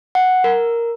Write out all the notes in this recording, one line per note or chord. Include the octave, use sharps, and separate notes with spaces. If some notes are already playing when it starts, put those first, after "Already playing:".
F#5
A#4